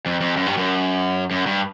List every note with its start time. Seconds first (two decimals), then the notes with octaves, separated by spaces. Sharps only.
0.06 F2
0.20 F2
0.37 F#2
0.46 G2
0.57 F#2
1.31 F#2
1.46 G2